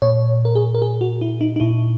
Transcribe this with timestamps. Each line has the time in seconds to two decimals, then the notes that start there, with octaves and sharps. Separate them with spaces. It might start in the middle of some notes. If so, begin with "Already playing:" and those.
0.02 A#2 C#5
0.45 A#4
0.55 G#4
0.75 A#4
0.82 G#4
1.01 F#4
1.21 E4
1.41 D#4
1.56 D#4
1.60 A#2 E4